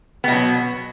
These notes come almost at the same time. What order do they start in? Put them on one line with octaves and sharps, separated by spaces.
B3 B2 F#3